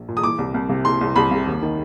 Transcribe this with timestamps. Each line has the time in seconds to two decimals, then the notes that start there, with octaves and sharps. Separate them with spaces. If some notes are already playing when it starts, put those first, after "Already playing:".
Already playing: A#1
0.08 A#2
0.17 D#6
0.23 E3 D6
0.38 C2
0.54 C2
0.69 C3
0.85 E3 C6
1.01 C2
1.16 C2 B5
1.31 C3
1.47 D#2
1.62 D#3